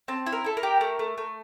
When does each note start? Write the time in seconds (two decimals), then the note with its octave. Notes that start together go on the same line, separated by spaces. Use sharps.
0.08 C4 A5
0.26 E4
0.32 A#4
0.44 E4 A4
0.57 A#4
0.63 G4
0.81 A3
0.99 A3
1.18 A3